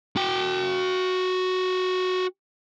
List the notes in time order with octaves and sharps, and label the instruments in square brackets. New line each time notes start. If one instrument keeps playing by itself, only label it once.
[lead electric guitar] F#4 G5